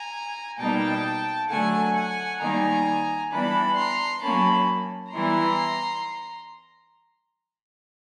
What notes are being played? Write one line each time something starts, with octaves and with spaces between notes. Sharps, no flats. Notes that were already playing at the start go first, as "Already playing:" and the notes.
Already playing: G#5 A#5
B2 G3 A#3 D#4 G5 A5
D3 F#3 A3 F#5 G#5
F#5 G#5
D#3 G3 A#3 D#4 G#5 A#5
E3 G3 B3 D4 A5 B5
A#5 C6
F#3 A#3 C#4 A5 B5
E3 G3 B3 E4 A#5 C6